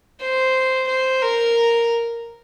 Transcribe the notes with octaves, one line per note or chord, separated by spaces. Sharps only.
C5
C5
A#4